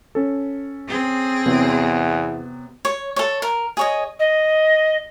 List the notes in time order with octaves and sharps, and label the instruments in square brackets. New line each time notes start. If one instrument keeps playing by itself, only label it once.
[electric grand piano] C#4 A4
[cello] C4 G#4
[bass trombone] E2 [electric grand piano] C3 F#3 B3
[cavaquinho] C#5
A4 C#5
A#4
G#4 C#5 D#5
[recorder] D#5